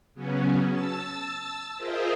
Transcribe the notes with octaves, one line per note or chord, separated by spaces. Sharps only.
C#3 F#3 B3 C#4
A5 E6 A6
F4 G#4 A#4 C5 D#5 E5